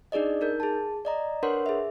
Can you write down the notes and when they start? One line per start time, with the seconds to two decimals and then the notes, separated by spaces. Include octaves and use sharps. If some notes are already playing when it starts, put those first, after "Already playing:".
0.12 D4 D#4 G#4 D5 D#5
0.41 D#4 A#4 G6
0.60 G#4 A5
1.05 D5 D#5 A#5
1.43 D4 A#4 B4 C#5 F#5 C6
1.66 G#4 E5